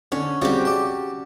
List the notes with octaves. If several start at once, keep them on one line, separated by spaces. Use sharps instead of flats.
D3 C#4
C#3 G3 C4 F#4 G4
D5 A5